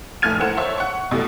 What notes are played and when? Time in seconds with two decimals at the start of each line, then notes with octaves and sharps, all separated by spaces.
0.22 F1 A2 A3 F6 G#6 D#7
0.39 E3 A3 A#4 C5 F#5 E7
0.57 A4 C5 C#5 E5 C#6
0.78 F#5 C#6
1.11 B2 E3 G3 A3